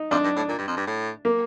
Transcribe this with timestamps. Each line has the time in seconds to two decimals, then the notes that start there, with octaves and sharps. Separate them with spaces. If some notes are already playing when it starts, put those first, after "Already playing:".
Already playing: D#4
0.11 F2 D4
0.24 G2
0.36 A2
0.49 A#2
0.58 G2
0.68 F2
0.77 G2
0.87 A2
1.25 A#3